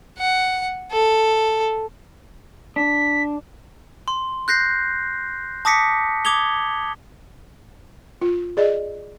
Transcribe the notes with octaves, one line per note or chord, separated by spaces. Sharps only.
F#5
A4
D4 B6
C6
F#6 G6 A#6 C7
A5 D6 D#6 A#6 B6 C#7
D6 D#6 G#6 F7 G7
F4
G#4 D5 D#5